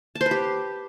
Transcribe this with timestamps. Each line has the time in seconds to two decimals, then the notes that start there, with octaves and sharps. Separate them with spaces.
0.15 A5
0.21 C5
0.26 B4
0.31 G4